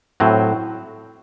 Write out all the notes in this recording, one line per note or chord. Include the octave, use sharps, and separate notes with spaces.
A2 F#3 C4